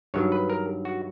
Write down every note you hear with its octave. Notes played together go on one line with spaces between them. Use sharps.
G2 D#3 F#3 C#5
B4
A#4
F#4